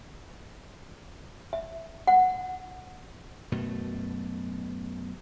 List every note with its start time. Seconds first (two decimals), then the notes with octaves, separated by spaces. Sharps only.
1.53 E5
2.07 F#5
3.52 F#2 B2 A3